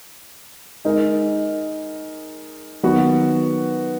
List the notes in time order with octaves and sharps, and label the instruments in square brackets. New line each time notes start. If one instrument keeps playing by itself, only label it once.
[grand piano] G#3 D#4 A#4
D#3 F#3 B3 F#4